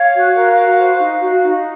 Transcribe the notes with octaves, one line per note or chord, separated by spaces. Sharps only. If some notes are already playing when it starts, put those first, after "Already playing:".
Already playing: C#5 F5
F#4
A#4
F#4
C5
D#4
F#4
D#4